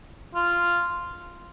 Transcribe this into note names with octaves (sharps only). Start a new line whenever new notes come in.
F4